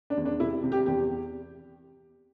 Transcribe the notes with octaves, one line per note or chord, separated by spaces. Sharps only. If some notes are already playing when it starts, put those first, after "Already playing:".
D4
E2
D4
C3 E4
C3
G4
E2 G4